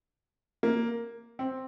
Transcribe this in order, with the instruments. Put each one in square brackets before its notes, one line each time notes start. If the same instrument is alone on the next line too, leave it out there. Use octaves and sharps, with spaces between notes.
[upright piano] A#3
C4